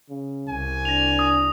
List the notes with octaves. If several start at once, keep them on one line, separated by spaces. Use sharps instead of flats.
C#3
C2 G#5
D4 A#6 F7
D#6